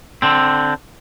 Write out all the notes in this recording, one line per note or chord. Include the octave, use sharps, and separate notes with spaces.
D3 C4